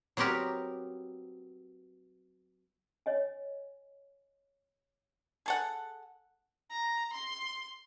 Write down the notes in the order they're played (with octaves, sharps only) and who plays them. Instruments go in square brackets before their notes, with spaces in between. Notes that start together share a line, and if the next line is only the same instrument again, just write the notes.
[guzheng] F#3 B3 C4 G4 A#4 B4
[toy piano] C#5 D#5 G#5
[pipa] G#4 A4 F#5
[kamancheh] A#5
C6